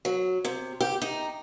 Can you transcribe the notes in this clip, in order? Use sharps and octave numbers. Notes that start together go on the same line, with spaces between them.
F#3
C3
G4
D#4